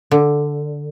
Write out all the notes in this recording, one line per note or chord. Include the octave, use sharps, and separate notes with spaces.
D3